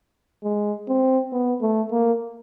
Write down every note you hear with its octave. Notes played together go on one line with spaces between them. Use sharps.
G#3
C4
B3
A3
A#3